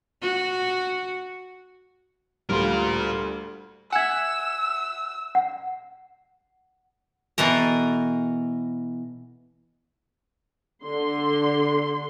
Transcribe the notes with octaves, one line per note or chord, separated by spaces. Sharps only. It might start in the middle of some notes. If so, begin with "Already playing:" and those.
F#4
D2 G3 F4 A#4
E5 F#5 G#5 E6 G#6
F#5
B2 E3 A4 A#4
D3 C6